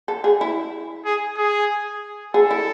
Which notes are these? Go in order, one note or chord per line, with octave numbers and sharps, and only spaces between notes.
A4
G#4
E4
G#4
G#4
G#4 A4
E4